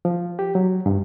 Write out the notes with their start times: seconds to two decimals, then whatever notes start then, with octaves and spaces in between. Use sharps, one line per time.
0.05 F3
0.39 G4
0.55 F#3
0.86 G2